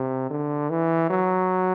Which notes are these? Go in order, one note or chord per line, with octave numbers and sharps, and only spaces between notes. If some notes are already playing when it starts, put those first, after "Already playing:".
Already playing: C3
D3
E3
F#3